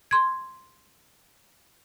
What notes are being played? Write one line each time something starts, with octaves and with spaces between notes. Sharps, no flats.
C6 G#6